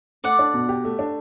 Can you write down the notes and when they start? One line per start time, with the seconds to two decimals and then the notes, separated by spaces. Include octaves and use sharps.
0.24 A3 D5 F#5
0.39 D4
0.54 B2
0.69 G4
0.84 A3
0.99 D4